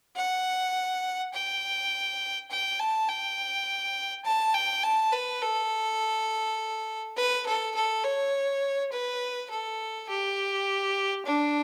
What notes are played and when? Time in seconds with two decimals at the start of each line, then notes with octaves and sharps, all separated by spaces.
0.16 F#5
1.33 G5
2.50 G5
2.80 A5
3.09 G5
4.25 A5
4.54 G5
4.84 A5
5.13 B4
5.42 A4
7.17 B4
7.46 A4
7.75 A4
8.04 C#5
8.92 B4
9.51 A4
10.09 G4
11.26 D4